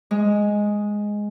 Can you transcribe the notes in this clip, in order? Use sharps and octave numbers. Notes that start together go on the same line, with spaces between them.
G#3